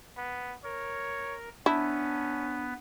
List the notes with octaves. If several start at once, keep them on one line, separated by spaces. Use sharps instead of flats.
B3
A#4 C#5
B3 C#4 D4 E4